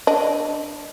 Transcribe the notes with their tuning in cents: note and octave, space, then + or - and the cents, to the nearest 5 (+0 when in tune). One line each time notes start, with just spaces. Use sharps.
D4 +0 D#5 +0